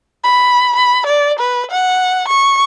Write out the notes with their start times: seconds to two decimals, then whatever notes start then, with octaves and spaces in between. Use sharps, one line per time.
0.24 B5
0.76 B5
1.06 D5
1.39 B4
1.71 F#5
2.28 C#6